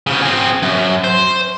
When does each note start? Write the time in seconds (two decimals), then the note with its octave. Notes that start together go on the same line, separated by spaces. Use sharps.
0.07 C#3 F3
0.22 C4 G#4
0.63 F#2
1.04 C5